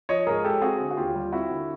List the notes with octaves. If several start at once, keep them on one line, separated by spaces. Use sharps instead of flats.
F3 C#5 D#5
G#2 G#4 A#4
G#3 G4 A4
C4 F#4 G#4
D3
F#4
D#2 F4 G4
G3
C4 E4 F#4
D3